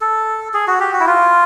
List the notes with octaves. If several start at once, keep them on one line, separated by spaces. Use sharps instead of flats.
A4
G#4
F#4
G4
F#4
E4
F4